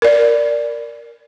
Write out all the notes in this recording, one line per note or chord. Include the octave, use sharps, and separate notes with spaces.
A#4 D5